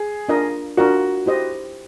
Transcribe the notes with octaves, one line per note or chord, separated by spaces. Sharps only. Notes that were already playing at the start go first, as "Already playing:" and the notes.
Already playing: G#4
D4 F4 A#4 D#5
D4 F4 F#4 A#4 D#5
E4 G4 C5 D#5